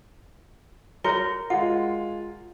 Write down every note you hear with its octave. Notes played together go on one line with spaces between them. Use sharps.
F#4 A#4 C#5 C#7 G7
G#3 F4 F#5